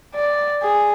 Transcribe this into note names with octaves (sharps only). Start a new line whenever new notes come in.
D5
G#4